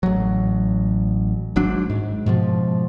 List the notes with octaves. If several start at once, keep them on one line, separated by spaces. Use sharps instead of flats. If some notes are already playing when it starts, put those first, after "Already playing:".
A1 F#3
G#1 G#2 F#3 D4
G#2
G#2 B2 F3